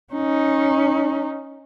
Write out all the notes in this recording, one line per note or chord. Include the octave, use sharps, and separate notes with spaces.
C#4 D#4